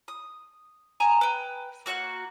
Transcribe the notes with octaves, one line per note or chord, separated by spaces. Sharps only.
D#6
G#5 A#5 D#6
B4 G5
A#3 F#4 F#5 F#6